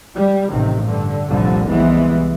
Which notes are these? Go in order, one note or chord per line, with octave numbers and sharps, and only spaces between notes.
G3
A1 C3 D#3
G2 D3
F1 C2 A#2 D3 G3
C2 E3 G#3 B3